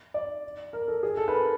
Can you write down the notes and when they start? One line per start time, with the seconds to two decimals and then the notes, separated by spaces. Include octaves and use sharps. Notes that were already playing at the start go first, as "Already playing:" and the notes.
0.14 D5
0.73 A#4
0.88 A4
1.03 G#4
1.17 A4
1.28 B4
1.32 A#4